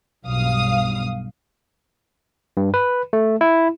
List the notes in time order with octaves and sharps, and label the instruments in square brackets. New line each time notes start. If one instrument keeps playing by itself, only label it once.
[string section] B1 G2 F5 D#6
[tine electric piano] G2
B4
A3
E4